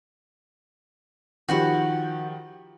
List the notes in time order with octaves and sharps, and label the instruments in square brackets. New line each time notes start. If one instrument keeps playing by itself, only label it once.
[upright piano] D#3 F3 G4 [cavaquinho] F#4 F#5 B5